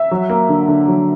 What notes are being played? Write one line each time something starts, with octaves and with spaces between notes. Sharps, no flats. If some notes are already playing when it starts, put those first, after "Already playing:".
Already playing: E5
F#3
A#3
D3
D3
F#3